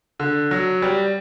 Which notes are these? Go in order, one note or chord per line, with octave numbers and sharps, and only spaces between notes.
D3
F#3
G3